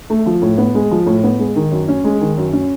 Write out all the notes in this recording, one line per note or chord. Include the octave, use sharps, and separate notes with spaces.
A3
F3
A2
B3
G#3
F3
A2
B3
G#3
D#3
F#2
C#4
G#3
D#3
F#2
C#4